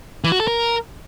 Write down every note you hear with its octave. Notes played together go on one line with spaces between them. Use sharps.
E3
F#4
A4
A#4